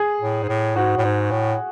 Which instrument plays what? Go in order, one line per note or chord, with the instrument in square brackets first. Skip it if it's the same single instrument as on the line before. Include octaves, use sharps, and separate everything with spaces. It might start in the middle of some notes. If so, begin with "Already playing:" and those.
Already playing: [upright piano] G#4
[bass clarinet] A2
G#2
A2
[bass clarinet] G#2 [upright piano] F#4
[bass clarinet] A2
G#2
A2